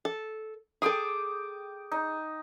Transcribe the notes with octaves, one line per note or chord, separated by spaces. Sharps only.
A4
G#4 A4 G5 D6 D#6
D#4